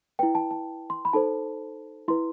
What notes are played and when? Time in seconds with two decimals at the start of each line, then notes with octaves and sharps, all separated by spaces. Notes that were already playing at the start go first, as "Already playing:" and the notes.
0.19 E4 B4 G5
0.35 A5
0.51 A5
0.90 C6
1.05 B5
1.13 D#4 A4 C5 A5
2.08 E4 B4 C6